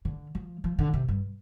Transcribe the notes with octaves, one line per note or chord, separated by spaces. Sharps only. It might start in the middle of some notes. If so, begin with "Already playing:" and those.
D3
F3
F3
D3
C3
G2